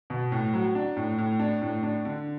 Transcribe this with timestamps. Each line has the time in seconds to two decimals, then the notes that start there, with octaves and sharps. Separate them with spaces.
0.10 B2
0.32 A2
0.54 F#3
0.75 D4
0.97 A2
1.18 A2
1.40 D4
1.62 A2
1.83 D4
2.05 D3